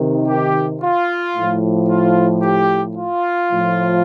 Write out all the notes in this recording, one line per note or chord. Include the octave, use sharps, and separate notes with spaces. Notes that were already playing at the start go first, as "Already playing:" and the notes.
Already playing: C3 D#3
G4
F4
A2 F3
F4
G4
F4
A2 F3